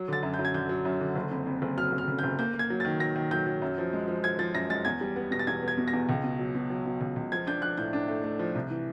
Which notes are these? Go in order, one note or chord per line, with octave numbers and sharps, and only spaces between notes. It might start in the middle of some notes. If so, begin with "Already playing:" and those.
Already playing: F#3
D3 A6
F#2
G6
F#2
G#6
D3 G6
F#3
F#2
D3
F#1
F2
F2
F#1
F#3 F6
F#1
F6
C#3
G6
F#1
A#3 G6
A#3
G#6
F#3
A6
D#3
F#3 A#6
D#3
F#3 G6
F#3
F#2
F3
G#3
F3
F3 G#6
F3 A6
F#2 A#6
G#3 A6
E2 G#6
G3
B3
B2 A#6
A6
E2 G#6
B3 G#6
B2
A#6
E2
C#2
B2
F#3
B2
F#3
B2
C#2
C#2
F3 G#6
D4 G6
F3 F#6
A2 G6
D4
A3
A3
F3
C2
E3